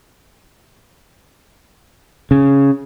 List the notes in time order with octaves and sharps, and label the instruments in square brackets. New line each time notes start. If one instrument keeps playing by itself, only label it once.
[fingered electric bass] C#3